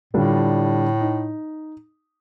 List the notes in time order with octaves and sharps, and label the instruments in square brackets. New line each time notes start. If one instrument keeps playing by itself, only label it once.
[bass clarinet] A2 [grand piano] D3 G3 D4 F4
[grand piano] D#4